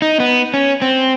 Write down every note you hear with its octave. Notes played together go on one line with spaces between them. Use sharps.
D#4
B3
C#4
C4